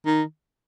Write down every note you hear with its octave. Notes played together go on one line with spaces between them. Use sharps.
D#3